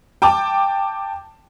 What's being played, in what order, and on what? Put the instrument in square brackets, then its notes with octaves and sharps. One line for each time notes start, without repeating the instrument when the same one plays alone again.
[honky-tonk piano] G5 A5 D6